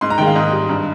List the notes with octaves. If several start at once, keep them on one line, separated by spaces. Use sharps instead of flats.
G#2 C6
A#5
D#3 G#3 G5
F5
G#2 D#5
G3
G2 A#5